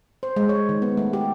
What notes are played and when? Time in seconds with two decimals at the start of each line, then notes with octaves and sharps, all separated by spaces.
0.23 C5
0.36 G#3
0.49 C#5
0.69 D#3
0.82 B3
0.97 A3
1.13 G4